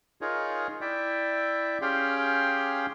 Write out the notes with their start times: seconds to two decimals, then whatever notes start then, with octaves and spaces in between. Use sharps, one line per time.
0.21 D#4 F4 G#4 A#4 C#5
0.81 E4 D5 E5 G5
1.82 C#4 G4 G#4 F5 G5 C6